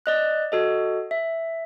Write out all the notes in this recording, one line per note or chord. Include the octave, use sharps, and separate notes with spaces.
D5 D#5 F#6
F#4 A4 D#5
E5